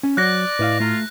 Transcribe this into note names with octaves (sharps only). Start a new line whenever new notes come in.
C#4
F#3 F#4 C#5 D5 F#6 A#6
A2 E4 B4 D#5 F5 F6
A3 F4 A#5